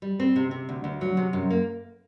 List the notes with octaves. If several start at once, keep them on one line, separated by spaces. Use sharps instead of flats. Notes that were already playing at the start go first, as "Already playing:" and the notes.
G3
C4
C3
C3
D2
D2
F#3
C3
F#2
A#3